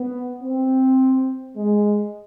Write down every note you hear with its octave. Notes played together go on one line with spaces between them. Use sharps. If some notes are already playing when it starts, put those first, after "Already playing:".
Already playing: B3
C4
G#3